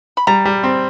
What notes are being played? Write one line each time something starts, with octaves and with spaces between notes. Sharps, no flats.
B5
G3 A#5
G3
C4